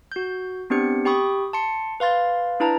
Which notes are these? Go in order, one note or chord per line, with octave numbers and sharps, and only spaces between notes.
F#4 G6
B3 C4 D4 G4 C#7
G4 G5 B5 C#6 D#6
A5 C6 C#7
B4 F5 C6 A6
D4 E4 B4 A5 A#5